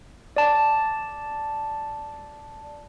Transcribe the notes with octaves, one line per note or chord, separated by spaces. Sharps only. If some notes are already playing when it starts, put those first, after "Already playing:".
D5 A5